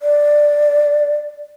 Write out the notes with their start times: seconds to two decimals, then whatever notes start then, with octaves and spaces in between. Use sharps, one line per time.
0.02 D5